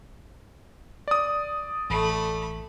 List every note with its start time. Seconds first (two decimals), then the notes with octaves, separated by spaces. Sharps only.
1.08 D5 D#6
1.90 A1 A3 B5